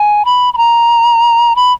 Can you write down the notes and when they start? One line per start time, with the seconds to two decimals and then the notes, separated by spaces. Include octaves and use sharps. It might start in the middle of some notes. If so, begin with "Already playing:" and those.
Already playing: G#5
0.25 B5
0.54 B5
0.57 A#5
1.56 B5